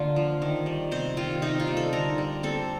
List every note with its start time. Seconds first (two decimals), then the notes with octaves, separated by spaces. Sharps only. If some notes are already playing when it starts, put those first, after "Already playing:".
Already playing: D3 A#3 F4
0.16 F3
0.42 D#3
0.66 G3
0.92 C3 C5
1.17 D#3 F4
1.42 C3 D#4
1.60 F4
1.67 G3
1.77 A4
1.93 D3 A#4
2.18 G3
2.43 C4 A4